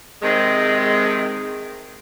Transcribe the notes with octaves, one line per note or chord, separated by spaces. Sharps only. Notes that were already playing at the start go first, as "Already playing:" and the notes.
C3 D#3 G#3